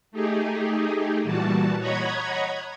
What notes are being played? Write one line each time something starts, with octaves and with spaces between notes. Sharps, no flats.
A3 D#4 G4 G#4
A#2 E3 G3 F#4 A5
C#5 D#5 F#5 A#5 B5 G#6